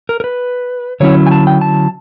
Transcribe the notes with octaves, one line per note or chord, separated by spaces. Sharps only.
A#4
A#4
B4
D3 F#3 A#3 C#4 E4 C#5
G#5
A5
G5
A5